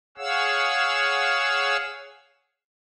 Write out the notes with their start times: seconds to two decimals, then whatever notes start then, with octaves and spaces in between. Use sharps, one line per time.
0.18 G#4 C#5 F5 F#5 E6